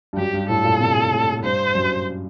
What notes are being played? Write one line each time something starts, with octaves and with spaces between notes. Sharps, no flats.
G2
F#2 G4
G2
A2 A4
A#2
C3
A2
G2 C5
F#2